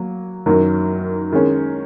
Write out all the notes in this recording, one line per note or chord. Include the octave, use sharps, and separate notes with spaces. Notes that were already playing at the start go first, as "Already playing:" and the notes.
Already playing: F#3 A#3
F#2 D#3 F#3
D#3 G#3 C#4